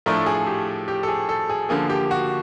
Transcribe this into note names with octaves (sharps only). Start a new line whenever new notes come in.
A2 F3 A3 D4 A#4
G#4
G4
G4
A4
G#4
A4
G#4
D3 F3 A#3 G#4
G4
F#4